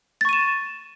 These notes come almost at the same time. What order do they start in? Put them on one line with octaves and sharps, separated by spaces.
A6 C#6 D#7 E7